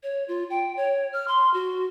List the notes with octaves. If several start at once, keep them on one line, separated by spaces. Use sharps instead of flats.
C#5
F4
G5
C#5
F6
C6
F#4